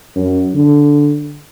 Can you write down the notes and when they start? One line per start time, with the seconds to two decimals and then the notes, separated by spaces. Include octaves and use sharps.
0.15 F#2
0.54 D3